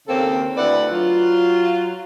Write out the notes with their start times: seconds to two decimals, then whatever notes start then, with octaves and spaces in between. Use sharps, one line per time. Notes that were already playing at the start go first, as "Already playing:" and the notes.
0.08 D#2 C#3 A#3 C4 A4
0.57 D2 E4 B4 D5 F#5
0.91 F#3 F4